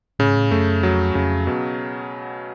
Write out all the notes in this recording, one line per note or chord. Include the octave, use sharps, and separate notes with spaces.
A2 C#3
G#2
A2
F#2 A3
F2 F#3
F2 C#3
B2